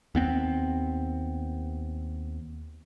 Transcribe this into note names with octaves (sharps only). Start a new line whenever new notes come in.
D#2 B3 C4